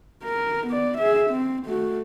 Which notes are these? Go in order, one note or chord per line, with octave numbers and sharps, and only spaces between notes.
A#4
B3 D5
G#4 E5
C4
A3 F#4